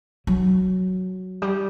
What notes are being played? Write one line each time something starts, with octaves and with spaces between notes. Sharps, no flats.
F#3
G3